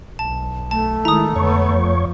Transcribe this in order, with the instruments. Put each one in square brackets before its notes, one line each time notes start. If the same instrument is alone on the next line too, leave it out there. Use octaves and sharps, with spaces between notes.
[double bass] B1 [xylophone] A5
[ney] A3 [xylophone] A5
[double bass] D#3 G#3 [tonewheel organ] E4 [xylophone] A#5 D#6
[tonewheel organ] F2 C#5 C#6 [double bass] D3 B3
[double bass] F3